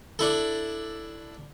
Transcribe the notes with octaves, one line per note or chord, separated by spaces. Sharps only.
D4 E4 A4